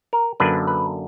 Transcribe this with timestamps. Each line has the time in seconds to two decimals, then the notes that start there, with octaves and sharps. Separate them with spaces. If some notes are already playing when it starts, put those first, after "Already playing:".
0.13 A#4
0.40 F#2 D3 A#3 D4 B4
0.67 B4